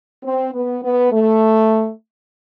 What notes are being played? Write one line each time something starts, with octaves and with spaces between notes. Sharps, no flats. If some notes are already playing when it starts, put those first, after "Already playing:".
C4
B3
B3
A3